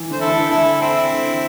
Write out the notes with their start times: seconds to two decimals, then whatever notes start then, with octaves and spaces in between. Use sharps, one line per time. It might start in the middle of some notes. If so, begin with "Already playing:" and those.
Already playing: E3
0.10 D3 C5
0.20 E4 A4
0.26 D3
0.30 E3
0.51 D3 E4 A4
0.81 C4 E4
1.12 D3